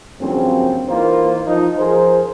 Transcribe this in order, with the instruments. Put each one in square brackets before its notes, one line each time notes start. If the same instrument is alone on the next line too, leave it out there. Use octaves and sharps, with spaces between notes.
[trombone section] G2 C#3 F3 F#3 A#3 C4
E3 A#3 D#4 F4 A#4 C5
F3 D#4
F3 G#4 A#4 C5